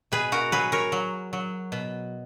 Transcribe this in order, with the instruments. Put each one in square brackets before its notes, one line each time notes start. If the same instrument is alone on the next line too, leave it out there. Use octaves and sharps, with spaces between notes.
[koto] B2 G#4 B4
F#4 A#4
F#3 G#4 B4
A#4 C#5
F#3
F#3
B2